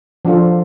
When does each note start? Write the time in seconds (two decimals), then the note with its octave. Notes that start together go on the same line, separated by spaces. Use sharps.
0.25 F3 D4 F4 A4